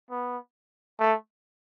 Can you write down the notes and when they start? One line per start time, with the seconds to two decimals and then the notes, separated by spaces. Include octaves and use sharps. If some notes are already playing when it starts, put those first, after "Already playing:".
0.11 B3
1.00 A3